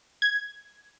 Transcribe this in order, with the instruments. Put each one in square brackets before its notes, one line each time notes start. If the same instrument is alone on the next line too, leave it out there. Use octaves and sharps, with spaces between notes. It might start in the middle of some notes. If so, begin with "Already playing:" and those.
[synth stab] G#6